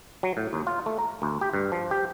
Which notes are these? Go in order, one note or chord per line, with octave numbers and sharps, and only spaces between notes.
F#3
A2
D#2
F4
A3
A#5
D2
G4
G2
F3
G4